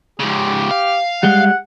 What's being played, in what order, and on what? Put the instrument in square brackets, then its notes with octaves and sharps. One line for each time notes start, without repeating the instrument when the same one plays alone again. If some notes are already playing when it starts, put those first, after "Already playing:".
[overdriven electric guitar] G#2 C#3 [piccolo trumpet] G4
[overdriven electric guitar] F5
[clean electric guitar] G3 G#3 [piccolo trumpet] F#5